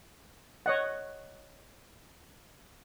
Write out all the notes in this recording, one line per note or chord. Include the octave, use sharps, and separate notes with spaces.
C#5 D#5 F#5